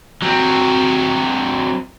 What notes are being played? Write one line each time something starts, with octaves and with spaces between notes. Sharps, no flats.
F#3 C4